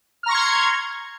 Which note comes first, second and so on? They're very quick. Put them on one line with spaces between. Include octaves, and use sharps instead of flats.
F6 A#5 C#6 C6 G#6